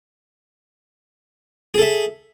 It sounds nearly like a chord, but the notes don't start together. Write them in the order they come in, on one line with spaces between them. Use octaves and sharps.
G#4 A4 E5